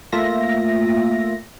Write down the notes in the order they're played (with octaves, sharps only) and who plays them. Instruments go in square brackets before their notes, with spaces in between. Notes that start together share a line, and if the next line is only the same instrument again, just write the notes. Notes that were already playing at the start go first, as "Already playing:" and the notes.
[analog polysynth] A3 A#3 F4 E5 A#6